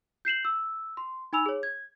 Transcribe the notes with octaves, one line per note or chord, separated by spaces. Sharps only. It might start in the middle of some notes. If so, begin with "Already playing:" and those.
G6 C7 E7 F#7
E6
C6
D#4 G#5 B5 E6 F7
G#4 C#5
G#6